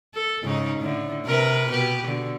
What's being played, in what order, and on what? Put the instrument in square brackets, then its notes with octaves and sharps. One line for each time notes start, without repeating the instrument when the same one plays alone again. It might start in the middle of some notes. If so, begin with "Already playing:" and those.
[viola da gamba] A4
G#2 C#3 D#4
A2 D3
C3 A#4 B4
B2 G4 B4
B2 D3